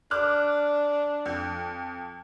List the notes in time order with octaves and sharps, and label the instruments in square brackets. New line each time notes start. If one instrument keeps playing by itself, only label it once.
[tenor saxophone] D4 [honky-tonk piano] D6 F6 F#6
[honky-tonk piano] F2